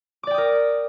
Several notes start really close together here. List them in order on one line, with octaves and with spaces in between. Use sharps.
D6 D5 G5 D#6 A#4